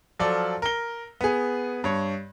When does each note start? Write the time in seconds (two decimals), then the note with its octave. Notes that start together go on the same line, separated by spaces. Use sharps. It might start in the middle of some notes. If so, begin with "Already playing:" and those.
0.19 F3 F#3 F4 A4 D5
0.62 A#4 G7
1.21 B3 G#4
1.84 G2 C#5